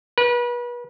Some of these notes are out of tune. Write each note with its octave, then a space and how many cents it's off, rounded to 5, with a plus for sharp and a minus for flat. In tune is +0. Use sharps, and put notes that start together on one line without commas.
B4 -35